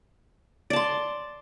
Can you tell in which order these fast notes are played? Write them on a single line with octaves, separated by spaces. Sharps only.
D5 A5 C6